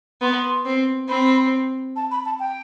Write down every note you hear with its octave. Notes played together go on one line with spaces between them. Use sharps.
B3 C6
C4
C4 B5
A5
B5
A5
G5